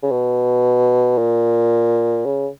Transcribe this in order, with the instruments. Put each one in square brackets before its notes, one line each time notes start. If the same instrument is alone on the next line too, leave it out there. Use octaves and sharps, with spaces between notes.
[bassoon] C#3
B2
A#2
C#3